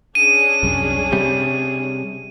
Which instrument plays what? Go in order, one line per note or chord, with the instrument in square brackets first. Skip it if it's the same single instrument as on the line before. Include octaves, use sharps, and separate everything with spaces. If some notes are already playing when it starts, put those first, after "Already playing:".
[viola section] C#4 D4 G#4 [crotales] D#7
[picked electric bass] C2 F#2
C3 G3